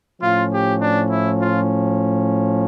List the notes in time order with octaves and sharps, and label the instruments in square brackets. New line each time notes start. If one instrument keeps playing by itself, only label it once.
[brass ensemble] A2 F3 C#4 F4
G4
D4
E4
F4